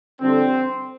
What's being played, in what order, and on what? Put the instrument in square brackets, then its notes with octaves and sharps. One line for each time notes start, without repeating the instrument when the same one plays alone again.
[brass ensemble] F2 D3 G3 C4